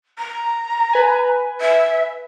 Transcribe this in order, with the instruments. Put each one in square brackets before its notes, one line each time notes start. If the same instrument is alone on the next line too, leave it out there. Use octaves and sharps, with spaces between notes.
[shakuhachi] A#5
[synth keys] B4 G#5
[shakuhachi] E5